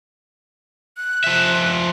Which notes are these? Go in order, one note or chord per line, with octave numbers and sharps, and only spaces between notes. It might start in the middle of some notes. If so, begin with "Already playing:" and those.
F#6
F3 E5